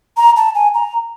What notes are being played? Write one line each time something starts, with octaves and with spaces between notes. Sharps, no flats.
A#5
A5
G#5
A#5